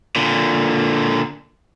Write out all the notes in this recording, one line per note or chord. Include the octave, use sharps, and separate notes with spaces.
A#2 D3